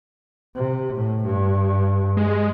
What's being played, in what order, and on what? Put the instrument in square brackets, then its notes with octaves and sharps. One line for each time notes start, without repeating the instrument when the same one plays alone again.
[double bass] C3
A2
G2
[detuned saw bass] G#3